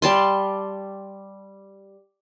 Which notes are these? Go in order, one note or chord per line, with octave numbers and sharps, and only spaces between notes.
G3 A5 C6